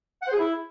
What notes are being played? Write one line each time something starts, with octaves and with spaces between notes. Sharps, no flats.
F#5
C5
G#4
E4